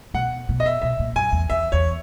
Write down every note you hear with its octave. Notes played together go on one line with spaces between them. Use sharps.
B2 F#5
B2
D#5
E5
B2 E5
A#2
F#2 G#5
E2
E2 E5
E2 C#5